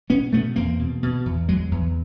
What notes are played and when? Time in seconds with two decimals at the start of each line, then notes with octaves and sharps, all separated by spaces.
0.10 B2 B3 C#4
0.33 B2 A3 B3
0.56 E2 A#3 C4
0.79 B2
1.03 B2
1.26 E2
1.49 E2 F#3 G#3
1.71 E2